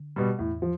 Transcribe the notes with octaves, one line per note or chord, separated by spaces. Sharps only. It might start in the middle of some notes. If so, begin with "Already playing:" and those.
Already playing: D3
B2 G3
E2 A2
F3